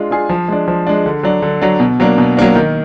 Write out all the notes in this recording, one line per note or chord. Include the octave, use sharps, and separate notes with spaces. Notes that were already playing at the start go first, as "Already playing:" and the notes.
Already playing: G#3 D4 F4
D4 F4 G#4
F3
G#3 D4
F3
G#3 D4
D3
F#3 D4
D3
F#3 D4
B2
F#3 A#3 D4
B2
F#3 A#3 D4
D#3